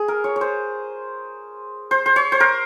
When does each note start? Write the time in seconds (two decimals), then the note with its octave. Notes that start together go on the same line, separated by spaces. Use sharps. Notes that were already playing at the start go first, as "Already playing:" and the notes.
Already playing: G#4
0.08 A#4
0.24 C#5
0.36 C#5
0.41 C5
1.91 C5
2.06 C5
2.16 C#5
2.32 C5
2.40 A#4